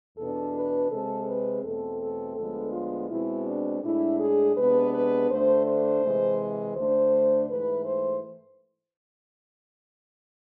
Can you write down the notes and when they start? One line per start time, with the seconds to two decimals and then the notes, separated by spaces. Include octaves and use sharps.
0.17 E2 B2 B3 D4 A4
0.54 B4
0.90 C3 G#3 C4 A4
1.27 B4
1.63 E2 B2 A3 C4 A4
2.01 A4
2.36 D2 D3 F3 G#3 B3 A4
2.73 F4
3.10 B2 G#3 C4 E4
3.47 D4
3.83 A2 G#3 D4 E4
4.20 G#4
4.56 C3 G#3 B3 D4 B4
4.93 B4
5.30 D2 D3 A3 D4 C5
5.66 C5
6.03 C3 E3 G#3
6.76 D2 D3 A3 D4 C5
7.49 G#2 E3 A3 B4
7.85 C5